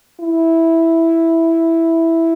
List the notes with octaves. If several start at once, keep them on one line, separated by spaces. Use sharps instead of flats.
E4